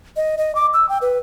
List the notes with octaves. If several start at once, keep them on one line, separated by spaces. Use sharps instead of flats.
D#5
D#5
D6
E6
G5
B4